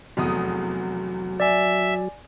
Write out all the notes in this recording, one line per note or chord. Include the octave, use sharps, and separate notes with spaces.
F1 E2 F#3 D#6
D5 E5 G#5